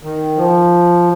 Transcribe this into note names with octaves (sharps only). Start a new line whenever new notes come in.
D#3
F3